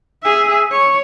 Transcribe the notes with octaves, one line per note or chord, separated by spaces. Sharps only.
G#4 E5
C#5